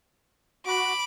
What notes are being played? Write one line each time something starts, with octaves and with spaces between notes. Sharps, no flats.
F#4 B5 D6